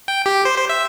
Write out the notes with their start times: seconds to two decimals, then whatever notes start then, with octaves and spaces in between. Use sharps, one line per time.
0.08 G5
0.26 G4
0.45 C5
0.57 C5
0.70 E5